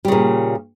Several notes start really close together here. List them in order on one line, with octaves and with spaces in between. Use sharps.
G3 C#3 A#2